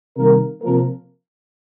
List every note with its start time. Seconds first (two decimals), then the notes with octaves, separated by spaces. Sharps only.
0.17 C3 D#3 G3 A#3 A#4
0.62 C3 F3 A#3 A#4